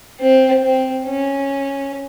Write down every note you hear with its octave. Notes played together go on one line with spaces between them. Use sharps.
C4
C4
C#4